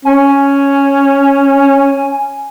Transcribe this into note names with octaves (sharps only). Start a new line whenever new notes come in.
C#4 G#5